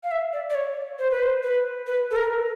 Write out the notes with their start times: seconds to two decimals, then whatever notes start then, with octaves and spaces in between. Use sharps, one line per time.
0.04 F5
0.11 E5
0.33 D5
0.50 D5
0.55 C#5
0.99 C5
1.11 B4
1.23 C5
1.43 B4
1.87 B4
2.11 A4
2.16 A#4